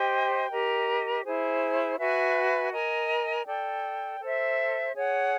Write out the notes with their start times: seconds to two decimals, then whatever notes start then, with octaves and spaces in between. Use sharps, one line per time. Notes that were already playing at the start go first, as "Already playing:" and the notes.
Already playing: G4 C5 D#5 G5
0.50 G4 A#4 D#5
1.25 E4 G#4 C5
1.98 F#4 B4 E5 G#5
2.72 A#4 D#5 G#5
3.46 A4 D5 G5
4.20 A4 C5 E5
4.94 G#4 C#5 F#5